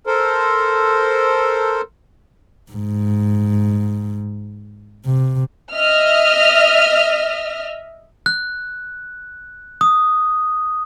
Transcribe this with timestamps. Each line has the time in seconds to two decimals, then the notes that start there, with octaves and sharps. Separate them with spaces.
0.07 A4 A#4 C5
2.72 G#2
5.06 C3
5.73 D#5 E5 F6
8.26 F#6
9.81 D#6